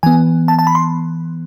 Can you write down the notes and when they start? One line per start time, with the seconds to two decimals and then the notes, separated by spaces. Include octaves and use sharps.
0.03 E3 B3 G#5
0.48 A5
0.59 A5
0.67 B5
0.75 C6